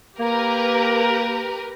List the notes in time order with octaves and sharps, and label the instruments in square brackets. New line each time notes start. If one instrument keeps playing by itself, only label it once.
[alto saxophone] A#3 [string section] G4 A#4 B4